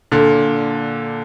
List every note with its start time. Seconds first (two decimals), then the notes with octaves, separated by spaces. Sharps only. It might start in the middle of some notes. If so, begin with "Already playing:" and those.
0.12 A#2 D3